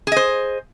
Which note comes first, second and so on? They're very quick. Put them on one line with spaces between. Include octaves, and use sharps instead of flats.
G#4 D#5 C5